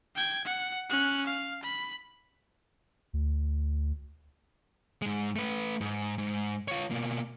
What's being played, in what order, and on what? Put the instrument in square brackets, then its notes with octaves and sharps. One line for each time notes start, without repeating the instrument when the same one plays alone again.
[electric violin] G5 G#6
F#5
C#4 F#6
F5
B5
[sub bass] D2
[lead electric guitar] G#2 G#3
A3 B4
G#2
G#2
F4 C#5
B2 A#3